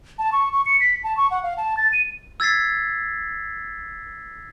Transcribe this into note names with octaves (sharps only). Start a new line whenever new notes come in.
A5
C#6
C#6
C#7
B6
A5
C#6
F#5
F5
A5
A6
D#7
E6 G#6 A6 B6 C7